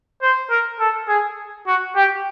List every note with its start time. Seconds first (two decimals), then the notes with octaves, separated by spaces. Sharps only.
0.22 C5
0.50 A#4
0.80 A4
1.08 G#4
1.67 F#4
1.96 G4